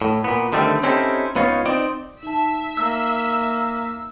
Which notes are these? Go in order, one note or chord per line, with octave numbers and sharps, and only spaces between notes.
A2
A#2 B3
D3 D#3 G3 A3 C4
C4 C#4 D#4 E4 G4 A4
C#2 B3 D#4 F4 C#5
C4 D#4 D5
D#4 E5 A5
A#3 E6